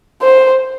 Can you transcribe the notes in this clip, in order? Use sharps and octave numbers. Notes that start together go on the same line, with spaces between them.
C5